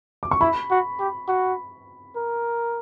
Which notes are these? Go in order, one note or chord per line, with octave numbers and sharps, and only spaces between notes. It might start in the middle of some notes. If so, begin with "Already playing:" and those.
D6
C#6
E4 B5
F#4
G4
F#4
A#4